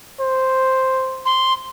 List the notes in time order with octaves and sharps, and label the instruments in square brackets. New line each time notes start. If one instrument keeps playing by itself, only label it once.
[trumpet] C5
[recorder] C6